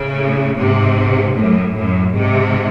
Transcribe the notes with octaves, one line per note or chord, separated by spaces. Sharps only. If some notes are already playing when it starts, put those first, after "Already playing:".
Already playing: A2 C#3
G#2 C3
F#2 A2
F#2 A2
G#2 C3